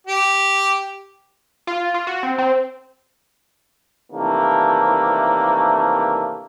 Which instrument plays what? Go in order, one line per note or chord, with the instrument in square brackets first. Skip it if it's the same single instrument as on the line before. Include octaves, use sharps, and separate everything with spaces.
[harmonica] G4
[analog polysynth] F4
F4
F#4
C4
C4
[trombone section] C3 D#3 E3 A3 A#3 D4